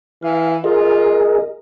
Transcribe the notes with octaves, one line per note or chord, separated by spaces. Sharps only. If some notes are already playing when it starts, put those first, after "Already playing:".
E3 F5
F4 G#4 A#4 D#5